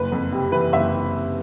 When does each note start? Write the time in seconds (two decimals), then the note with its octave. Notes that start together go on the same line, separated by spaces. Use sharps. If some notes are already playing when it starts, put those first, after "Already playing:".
Already playing: F#1 B4
0.12 F2
0.32 C3
0.52 E3 B4
0.73 F#1 E5